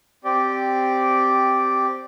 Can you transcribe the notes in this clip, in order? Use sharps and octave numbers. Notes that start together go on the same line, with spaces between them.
C4 G4 D5